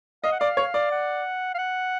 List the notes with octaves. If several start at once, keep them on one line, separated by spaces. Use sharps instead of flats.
D#5 F5
F#5
D5 F5
C#5
D5
F#5
F5
F#5